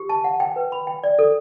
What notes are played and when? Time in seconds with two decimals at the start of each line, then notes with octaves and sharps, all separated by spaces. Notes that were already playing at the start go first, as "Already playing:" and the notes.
Already playing: G4
0.09 A5
0.24 F#5
0.40 G5
0.56 B4
0.72 B5
0.87 G5
1.04 D5
1.19 A4